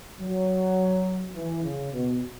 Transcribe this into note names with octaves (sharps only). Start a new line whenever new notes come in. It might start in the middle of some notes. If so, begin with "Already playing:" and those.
F#3
E3
C#3
B2